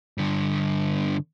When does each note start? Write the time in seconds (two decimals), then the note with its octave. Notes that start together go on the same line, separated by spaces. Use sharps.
0.18 G2 D3